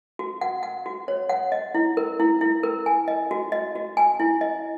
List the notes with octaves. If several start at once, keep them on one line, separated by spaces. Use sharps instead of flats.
F#4
F#5
F#5
F#4
C#5
F#5
D#5
E4
A#4
E4
E4
A#4
G#5
D#5
F#4
D#5
F#4
G#5
E4
D#5